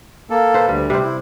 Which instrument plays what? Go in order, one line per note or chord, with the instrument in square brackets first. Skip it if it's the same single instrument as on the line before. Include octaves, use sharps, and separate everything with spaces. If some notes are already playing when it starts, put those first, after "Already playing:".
[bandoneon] A#3 A4
[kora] B4 C5
[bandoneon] D2 [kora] G3
[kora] C3 C5 [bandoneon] G3
[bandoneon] E4